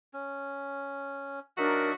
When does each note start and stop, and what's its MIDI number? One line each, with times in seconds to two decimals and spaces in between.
0.13 1.40 61
1.58 1.94 54
1.58 1.91 62
1.58 1.94 63
1.58 1.95 66
1.58 1.91 70
1.58 1.94 76